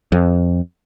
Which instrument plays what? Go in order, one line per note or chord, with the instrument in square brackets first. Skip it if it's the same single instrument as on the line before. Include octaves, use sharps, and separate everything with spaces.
[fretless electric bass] F2